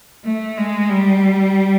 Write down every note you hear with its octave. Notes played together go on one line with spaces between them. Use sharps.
A3
G#3
G3